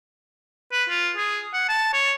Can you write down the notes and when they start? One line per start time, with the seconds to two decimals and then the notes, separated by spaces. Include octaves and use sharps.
0.72 B4
0.89 F4
1.17 G#4
1.54 F#5
1.69 A5
1.93 C#5